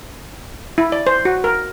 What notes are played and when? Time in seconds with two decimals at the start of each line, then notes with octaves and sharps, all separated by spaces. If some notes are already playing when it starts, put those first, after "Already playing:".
0.78 E4
0.92 D5
1.07 C5
1.25 F#4
1.44 A#4